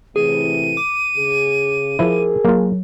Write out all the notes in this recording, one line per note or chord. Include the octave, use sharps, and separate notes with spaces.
A2 C3 E3 G#4 D#7
D6
C#3 G#4
F3 E4 G#4 A#4
F#3 A#3 F4